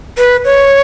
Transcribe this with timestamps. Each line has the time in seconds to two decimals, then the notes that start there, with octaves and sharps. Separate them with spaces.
0.18 B4
0.45 C#5